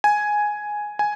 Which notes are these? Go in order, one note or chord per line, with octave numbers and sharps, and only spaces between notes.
G#5
G#5